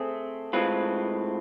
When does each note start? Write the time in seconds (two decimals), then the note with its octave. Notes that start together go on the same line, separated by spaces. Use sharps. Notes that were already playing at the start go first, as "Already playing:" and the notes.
Already playing: A3 C4 G#4
0.53 A2 G#3 C4 F4 B4